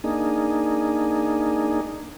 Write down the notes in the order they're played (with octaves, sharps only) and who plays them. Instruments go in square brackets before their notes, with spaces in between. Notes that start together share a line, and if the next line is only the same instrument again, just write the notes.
[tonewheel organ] A#3 D4 D#4 G#4